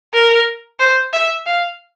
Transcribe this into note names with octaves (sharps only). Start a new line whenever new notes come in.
A#4
C5
E5
F5